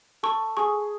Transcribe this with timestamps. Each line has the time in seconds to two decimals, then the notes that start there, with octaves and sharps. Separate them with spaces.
0.23 A4 C#6
0.57 G#4 C#6